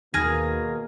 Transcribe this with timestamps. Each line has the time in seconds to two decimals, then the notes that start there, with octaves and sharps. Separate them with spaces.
0.14 D#2 B2 D#3 A#3 G#4 F6 A#6